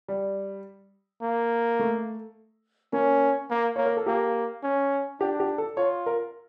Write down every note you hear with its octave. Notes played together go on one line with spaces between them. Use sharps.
G3
A#3
A3
A#3 C#4
A#3
A#3 C#5
A#4
A4
A#3 G4
C#4
D4 G4
G4
A4
F4 C#5
A#4